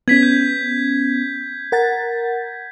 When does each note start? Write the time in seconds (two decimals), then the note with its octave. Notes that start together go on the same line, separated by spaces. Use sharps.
0.08 B3 C#4 G#6 B6
0.23 G6
1.72 A#4 F#5 A6